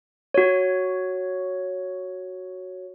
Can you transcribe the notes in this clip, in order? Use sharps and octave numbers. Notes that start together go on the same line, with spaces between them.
F#4 C#5